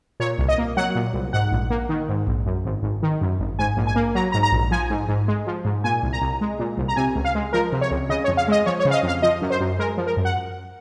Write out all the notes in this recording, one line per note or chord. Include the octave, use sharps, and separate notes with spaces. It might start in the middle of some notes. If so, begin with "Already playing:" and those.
A#2 C#5
C2
D#5
A#3
F#3 F#5
A#2
C2
G#2 F#5
A#1
A#3
D#3
G#2
A#1
F#2
G#1
G#1
D#3
F#2
G#1
G#2 G#5
A#1
G#5
A#3
F#3 A#5
G#2 A#5
A#5
A#1
F3 G#5
G#2
G#2
G#3
F3
G#2
A#2 G#5
C2
A#5
C2
G#3
A#2
C2
A#5
C3 G#5
C#2
F5
G#3
F3 A#4
C3
C#5
C#2
C#3 D#5
C#5
F2
F5
G#3 D#5
F3 C#5
C#5
C#3
F5
D#5
F2 F5
F3 D#5
F#2
C5
F#2
G#3 A#4
F3
A#4
F#2
F#5